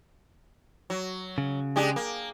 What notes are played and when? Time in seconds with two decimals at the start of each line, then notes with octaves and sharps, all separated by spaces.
0.90 F#3
1.38 C#3
1.76 G#3 D4 G4
1.96 A#3